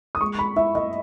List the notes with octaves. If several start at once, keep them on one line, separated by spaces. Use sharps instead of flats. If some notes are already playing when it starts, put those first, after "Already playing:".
D#6
G#3 C#6
B5
E4 E5
D#5